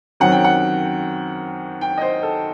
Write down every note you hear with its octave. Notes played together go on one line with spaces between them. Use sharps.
F#2 D#3 F#3 C4 F#5
G5
F#5
G5
D#5
C5
A4